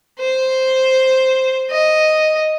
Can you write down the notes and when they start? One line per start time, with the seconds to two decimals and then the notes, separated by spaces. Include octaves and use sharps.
0.20 C5
1.71 D#5